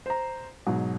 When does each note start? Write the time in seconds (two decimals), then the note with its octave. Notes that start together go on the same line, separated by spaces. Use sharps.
0.06 C5 A#5
0.67 G#2 B2 F#3